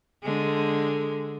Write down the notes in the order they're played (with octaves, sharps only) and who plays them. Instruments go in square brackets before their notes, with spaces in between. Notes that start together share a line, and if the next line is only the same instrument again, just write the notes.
[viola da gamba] D3 G#3